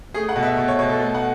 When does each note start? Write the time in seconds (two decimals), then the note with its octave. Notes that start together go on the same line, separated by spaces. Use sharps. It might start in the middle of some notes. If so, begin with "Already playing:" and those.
0.14 A3 G#4
0.29 F#5
0.36 B2
0.42 E5
0.57 B2
0.68 C#5
0.79 B2 C#5
0.89 A4
1.00 A3
1.14 F#5